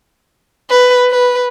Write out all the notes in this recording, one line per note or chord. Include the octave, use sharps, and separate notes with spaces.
B4
B4